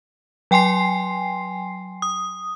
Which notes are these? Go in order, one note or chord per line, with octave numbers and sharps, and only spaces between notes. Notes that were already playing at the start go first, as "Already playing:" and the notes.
F#3 G5 G#5 C6 C7
D#6